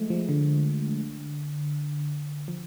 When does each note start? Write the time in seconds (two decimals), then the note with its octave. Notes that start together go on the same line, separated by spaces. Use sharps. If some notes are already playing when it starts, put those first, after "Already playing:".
Already playing: F3 G#3 A3
0.10 F3
0.29 D3
2.48 F3